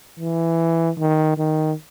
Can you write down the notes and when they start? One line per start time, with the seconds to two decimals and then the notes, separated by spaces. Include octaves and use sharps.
0.19 E3
0.98 D#3
1.37 D#3